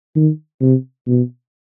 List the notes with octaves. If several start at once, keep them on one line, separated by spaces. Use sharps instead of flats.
D#3
C3
B2